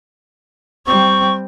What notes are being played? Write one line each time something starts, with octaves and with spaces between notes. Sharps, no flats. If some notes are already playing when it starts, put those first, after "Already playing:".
G3 C4 C#6